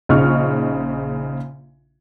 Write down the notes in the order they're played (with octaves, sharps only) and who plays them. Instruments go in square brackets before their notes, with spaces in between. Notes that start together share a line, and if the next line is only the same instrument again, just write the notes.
[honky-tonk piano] A#1 C#3 D#4 C#6 F6